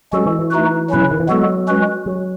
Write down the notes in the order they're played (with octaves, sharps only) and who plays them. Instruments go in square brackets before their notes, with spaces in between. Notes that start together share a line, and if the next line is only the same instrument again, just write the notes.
[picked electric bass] F#3 [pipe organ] G#3 C#4 F#4 A4
[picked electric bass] E3
E3
[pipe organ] A3 D#4 F#4 B4
[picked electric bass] B2 [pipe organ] F#3 C#4 E4 B4
[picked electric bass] C#3
D#3
E3
[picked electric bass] F#3 [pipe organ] G#3 B3 F#4 A4
[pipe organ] G#3 C#4 F#4 B4
[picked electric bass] F#3